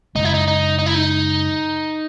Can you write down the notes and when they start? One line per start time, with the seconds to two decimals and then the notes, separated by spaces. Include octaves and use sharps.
0.15 F#2 C#3 G#3 D#4
0.25 E4
0.34 D#4
0.48 D#4
0.79 D#4
0.86 E4
0.94 D#4